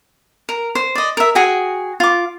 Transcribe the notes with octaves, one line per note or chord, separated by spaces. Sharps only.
A#4
C5
D5 D#5
A#4 E5
F#4 G#4 G5 G#5
F4 D6